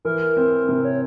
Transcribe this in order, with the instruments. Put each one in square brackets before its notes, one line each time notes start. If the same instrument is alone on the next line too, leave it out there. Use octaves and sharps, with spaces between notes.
[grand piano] E3 [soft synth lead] A#4
[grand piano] C4
C3
[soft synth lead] C#5